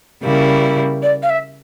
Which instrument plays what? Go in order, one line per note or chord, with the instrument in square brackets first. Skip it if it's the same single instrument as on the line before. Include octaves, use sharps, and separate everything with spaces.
[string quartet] C#3 G3 A#3 E4
[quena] D5
F5
E5